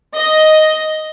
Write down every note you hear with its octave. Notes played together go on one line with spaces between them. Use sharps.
D#5